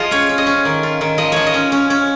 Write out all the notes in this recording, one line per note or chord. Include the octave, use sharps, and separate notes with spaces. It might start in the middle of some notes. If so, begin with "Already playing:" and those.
Already playing: F3 F4 G#4 D#5
C#4 C#5
C#4
D#5
C#4
D#3
F4
D#3
F3 D#5
F3 C#5
D#5
C#4
C#4
C#4